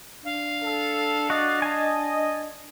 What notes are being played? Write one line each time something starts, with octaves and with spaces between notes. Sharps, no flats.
D4 F5
A4
F#4 D5 D#5
G#5 A5